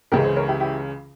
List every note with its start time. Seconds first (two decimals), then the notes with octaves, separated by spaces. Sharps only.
0.12 C#2 C#3 E3 G#3 G4 A#4
0.24 G#4 C5
0.36 A#4 C#5
0.48 E4 G4
0.60 E4 G4